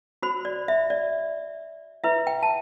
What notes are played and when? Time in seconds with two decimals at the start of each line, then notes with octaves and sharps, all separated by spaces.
0.23 F#4 C5 B5
0.45 D5
0.68 E5
0.90 D5
2.04 E4 B4 E5
2.27 G5
2.43 A5